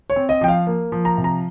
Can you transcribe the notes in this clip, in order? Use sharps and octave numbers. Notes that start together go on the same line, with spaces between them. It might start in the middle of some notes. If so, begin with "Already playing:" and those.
C#5
C4
D#5
F3 G5
F5
A#3
F3
A#5
C3
A#5